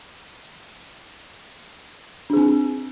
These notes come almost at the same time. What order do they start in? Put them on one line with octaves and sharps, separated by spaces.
D4 G#4 C4